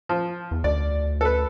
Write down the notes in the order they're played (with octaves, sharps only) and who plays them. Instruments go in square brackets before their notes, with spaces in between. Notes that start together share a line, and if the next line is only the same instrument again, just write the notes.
[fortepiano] F3
[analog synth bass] E2
[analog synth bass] D2 [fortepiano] D5
[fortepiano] A4 B4